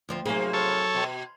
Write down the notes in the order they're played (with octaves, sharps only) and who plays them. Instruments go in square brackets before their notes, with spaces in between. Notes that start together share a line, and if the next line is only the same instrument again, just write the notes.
[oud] D2 F3 C4
[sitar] G#2 C3 A#3 [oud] F#3 G#4
[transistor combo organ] A4 C#5
[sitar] B2